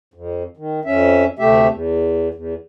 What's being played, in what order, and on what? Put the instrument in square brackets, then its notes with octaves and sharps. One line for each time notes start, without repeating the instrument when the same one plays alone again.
[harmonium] F2
D#3
F2 C#4 E5
D2 C3 A3 G4 E5
E2
E2